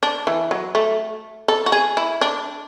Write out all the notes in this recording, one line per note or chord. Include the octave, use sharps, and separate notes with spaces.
D4
E3
F#3
A3
A4
F#4
G#4
E4
D4